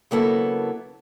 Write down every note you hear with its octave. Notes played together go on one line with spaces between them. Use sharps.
C#3 F#3 A#3 B3 E4 A4